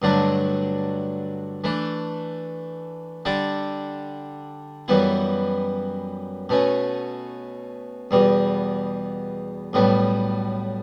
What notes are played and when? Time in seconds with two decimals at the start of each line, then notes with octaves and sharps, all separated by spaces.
0.02 G2 D3 F#3 A3 D4
1.64 E3 A3 D4
3.25 D3 G3 D4 A4 D5
4.88 F#2 E3 G3 B3 E4
6.49 B2 A3 C#4
8.11 E2 B2 G3
9.73 B1 A2 G3 B3